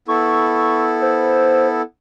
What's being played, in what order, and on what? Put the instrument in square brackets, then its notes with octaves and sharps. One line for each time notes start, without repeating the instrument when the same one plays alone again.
[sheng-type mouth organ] B3 E4 A4 [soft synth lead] C#6
[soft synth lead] C5